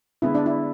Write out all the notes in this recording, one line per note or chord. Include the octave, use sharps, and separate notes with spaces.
D3 G#3 B3 E4
D4
E4